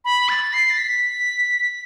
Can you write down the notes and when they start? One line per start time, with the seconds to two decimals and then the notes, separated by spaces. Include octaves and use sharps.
0.05 B5
0.29 A6
0.53 C7
0.70 A6
0.78 B6